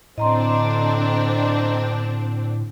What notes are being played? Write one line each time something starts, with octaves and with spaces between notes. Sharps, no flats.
A2 D3 C4 D4 D#5 A#5 C6